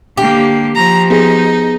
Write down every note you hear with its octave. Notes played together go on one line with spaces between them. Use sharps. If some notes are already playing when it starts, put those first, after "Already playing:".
D3 A#3 G4
F3 A#5
B3 D#4 G#4